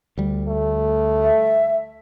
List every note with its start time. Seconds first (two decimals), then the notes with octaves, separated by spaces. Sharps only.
0.18 D2 G3
0.48 A3
1.22 E5